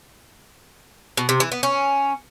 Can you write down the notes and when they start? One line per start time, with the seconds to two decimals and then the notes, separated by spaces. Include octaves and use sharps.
1.17 B2
1.29 C3
1.40 E3
1.52 B3
1.63 C#4